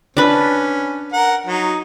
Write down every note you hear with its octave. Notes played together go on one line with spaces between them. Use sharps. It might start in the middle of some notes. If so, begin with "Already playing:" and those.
C#4 D4 B4
A#4 F#5
F#3 D#4